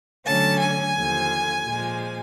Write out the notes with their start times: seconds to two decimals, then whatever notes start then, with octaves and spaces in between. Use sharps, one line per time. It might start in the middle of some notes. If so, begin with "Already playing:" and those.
0.25 D3 F#3 A3 C#4 A5
0.60 G#5
0.95 D#2 D3 F3
1.64 A#2 F3 G#3